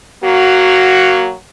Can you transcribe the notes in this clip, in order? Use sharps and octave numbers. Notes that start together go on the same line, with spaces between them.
F#3 A#3 F#4